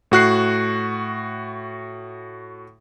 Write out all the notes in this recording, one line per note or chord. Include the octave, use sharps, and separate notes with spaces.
A2 F#4 F#6 C7